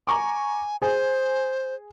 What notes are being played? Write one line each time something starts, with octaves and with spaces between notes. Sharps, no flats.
G#5 A#5 C#6 D6
G#4 C5 G#5